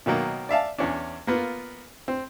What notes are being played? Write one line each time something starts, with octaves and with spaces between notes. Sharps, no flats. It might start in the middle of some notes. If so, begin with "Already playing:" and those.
B2 D#3 F#3 A#3
D5 E5 F5 A5
E2 C#4 D4
A#3 B3 F4
C4